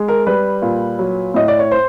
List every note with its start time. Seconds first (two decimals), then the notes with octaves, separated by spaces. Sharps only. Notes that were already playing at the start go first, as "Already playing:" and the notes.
Already playing: G#3
0.08 A#4
0.27 G3 B4
0.62 A#2
0.99 F#3
1.34 A2 D#5
1.48 D5
1.59 C#5
1.71 C5